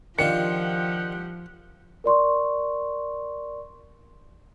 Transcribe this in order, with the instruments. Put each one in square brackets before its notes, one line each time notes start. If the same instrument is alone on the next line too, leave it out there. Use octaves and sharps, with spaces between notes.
[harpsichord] D#3 D4 F4 [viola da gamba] F3 [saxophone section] G4 F#5 [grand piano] C#7
[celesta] A#4 D5 C6 C#6